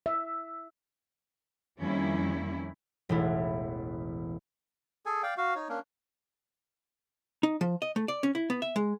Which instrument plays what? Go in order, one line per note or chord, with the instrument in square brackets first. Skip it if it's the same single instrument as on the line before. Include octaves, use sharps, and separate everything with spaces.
[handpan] E5
[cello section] F2 D#3 G3 A#3 C#4 E4
[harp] E1 A1 E4
[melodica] G#4 A4 G#5
D5 F5 G5
F#4 F5
D#4 C#5
A#3 C#4 D4
[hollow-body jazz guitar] D#4
F3
D#5
A3
D5
C#4
E4
B3
E5
G#3